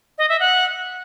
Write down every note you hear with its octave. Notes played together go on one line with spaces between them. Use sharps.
D#5
E5
F#5